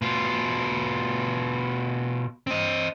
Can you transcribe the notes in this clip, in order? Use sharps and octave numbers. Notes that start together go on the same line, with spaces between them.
B2 F4
C4 D#5